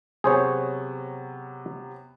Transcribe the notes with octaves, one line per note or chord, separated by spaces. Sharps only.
C3 F#3 B3 G#4 C5 C#5